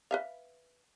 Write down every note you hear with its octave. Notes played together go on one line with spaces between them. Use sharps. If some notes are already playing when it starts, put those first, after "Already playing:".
B4 E5 F5